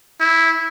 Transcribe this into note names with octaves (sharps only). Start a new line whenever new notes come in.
E4